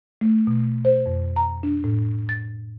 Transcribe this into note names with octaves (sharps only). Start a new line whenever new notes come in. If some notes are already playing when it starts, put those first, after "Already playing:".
A3
B2
C5
F2
A#5
D4
A2
A6